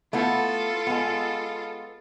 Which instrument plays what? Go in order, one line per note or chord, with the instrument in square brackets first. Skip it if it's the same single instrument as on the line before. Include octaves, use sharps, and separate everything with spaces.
[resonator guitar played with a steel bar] A3 B3 E4 [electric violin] F4 A4
[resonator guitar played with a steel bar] G#3 B3